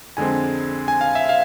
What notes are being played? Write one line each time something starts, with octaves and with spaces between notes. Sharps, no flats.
F2 D3 G#3 C4 G#5
G#5
F5
E5
F5